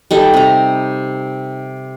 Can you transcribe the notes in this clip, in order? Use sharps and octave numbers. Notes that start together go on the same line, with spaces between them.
G3 D#4 A4
C3 A#5